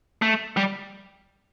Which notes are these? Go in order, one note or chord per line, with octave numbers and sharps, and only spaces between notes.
A3
G3